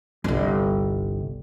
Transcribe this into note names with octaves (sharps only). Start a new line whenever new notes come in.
G1 C2